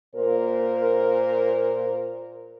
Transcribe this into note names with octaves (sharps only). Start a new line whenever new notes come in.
A#2 A#4 C5